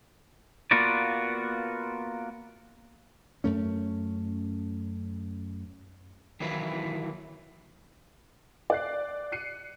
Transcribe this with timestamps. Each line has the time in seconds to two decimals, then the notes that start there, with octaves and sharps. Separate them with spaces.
0.71 A#3 B3 F4 F#4 B4 D5
3.44 F#2 A3 C#4
6.40 D#3 E3 F#3 A#3 E4 B4
8.70 D5 F#6 C7
9.32 F#6 C7 C#7 D#7